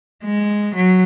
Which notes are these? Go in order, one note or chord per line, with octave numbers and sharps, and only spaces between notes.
G#3
F#3